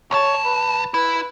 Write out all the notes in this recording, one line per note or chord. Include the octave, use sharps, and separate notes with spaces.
B1 C#5 A5
B4
E4 B4